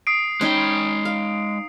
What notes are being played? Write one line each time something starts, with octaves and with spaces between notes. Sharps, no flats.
D#6 C7 D7
G#3 C#4 D#4 G5 B5
F5